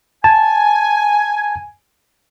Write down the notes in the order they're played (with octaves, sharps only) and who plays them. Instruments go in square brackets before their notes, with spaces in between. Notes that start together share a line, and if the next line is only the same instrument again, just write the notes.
[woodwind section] G#5 [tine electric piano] A5